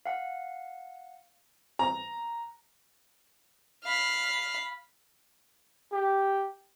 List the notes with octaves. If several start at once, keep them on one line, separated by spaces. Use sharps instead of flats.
F5 F#5
A#5
F5 B5
G4